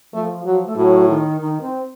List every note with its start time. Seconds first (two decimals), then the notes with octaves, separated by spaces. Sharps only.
0.13 F3 A3
0.45 F3 F#3
0.66 A3
0.77 A2 F#3
1.09 D#3
1.41 D#3
1.61 C4